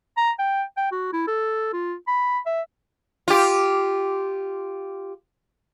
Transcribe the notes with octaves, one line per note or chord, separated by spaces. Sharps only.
A#5
G5
G5
F#4
E4
A4
F4
B5
E5
F4 G4